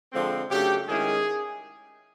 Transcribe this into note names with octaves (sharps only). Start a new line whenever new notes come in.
D3 F3 G#3 C4
C#3 F#3 A3 D4 G4
D#3 G#3 C#4 E4 G#4